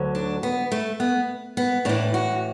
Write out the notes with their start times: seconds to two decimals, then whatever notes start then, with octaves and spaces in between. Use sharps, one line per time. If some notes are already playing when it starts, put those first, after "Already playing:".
Already playing: D2 D3 F#3
0.15 D4
0.43 B3
0.72 A3
1.00 B3
1.57 B3
1.85 A2 E3 D4
2.14 F#4